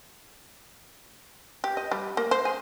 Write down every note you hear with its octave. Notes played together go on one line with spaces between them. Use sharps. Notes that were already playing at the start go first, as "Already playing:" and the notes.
G4
D#5
G3
A#3
C5
G#4